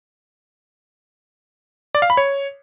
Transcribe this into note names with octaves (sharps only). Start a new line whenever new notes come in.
D5
F5
B5
C#5